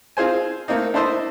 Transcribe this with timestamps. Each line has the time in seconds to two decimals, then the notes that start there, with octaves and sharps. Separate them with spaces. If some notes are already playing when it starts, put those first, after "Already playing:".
0.17 C4 F4 G#4 C5 G#5
0.68 A3 A#3 C4 D#4
0.94 D4 E4 A4 B4 C5 D#5